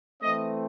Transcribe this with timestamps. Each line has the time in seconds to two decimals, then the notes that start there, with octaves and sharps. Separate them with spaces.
0.21 E3 A3 C4 D#5